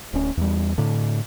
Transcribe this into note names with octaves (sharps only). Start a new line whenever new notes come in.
D1 C#4
E2 G3
A2 D3